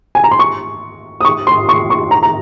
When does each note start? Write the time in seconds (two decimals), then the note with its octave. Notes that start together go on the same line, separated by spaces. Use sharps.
0.15 G#5
0.24 A#5
0.31 C6
0.39 C#6
1.21 D#6
1.25 C#6
1.47 C6
1.69 C#6
1.90 C#6
2.11 A#5
2.23 A#5